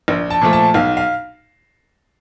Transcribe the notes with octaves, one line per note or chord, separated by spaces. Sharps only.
A#1
A5
A#2 F3 A3
A5
B1 F5
F5